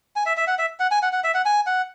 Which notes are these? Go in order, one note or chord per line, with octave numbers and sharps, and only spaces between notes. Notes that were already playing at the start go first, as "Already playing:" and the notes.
G#5
E5
E5
F#5
E5
F#5
G#5
F#5
F#5
E5
F#5
G#5
F#5